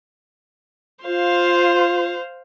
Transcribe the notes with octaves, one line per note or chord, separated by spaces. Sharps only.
F4 C5 F5